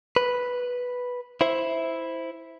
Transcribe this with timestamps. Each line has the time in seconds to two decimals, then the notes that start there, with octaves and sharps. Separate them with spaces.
0.16 B4
1.41 E4 C5 E5